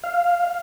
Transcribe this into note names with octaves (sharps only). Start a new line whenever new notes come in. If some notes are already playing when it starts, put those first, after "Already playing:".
F5